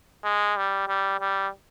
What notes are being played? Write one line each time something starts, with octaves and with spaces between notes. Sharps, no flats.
G#3
G3
G3
G3